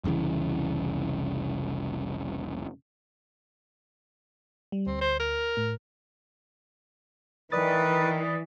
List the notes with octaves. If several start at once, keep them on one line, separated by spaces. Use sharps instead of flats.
F1 C2 C#3 E3
G3
D2 C4
C5
A#4
A2
D#3 E3 B4 D5 D#6 A6